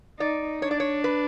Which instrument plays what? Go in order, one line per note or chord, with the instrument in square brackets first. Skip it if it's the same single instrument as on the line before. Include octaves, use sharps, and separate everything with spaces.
[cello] D#4 [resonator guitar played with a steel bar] D5
[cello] D4 [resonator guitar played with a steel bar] C#5
[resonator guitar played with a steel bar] D5
C#5
B4